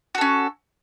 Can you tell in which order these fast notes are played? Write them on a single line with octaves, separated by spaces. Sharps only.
F#4 A4 C#4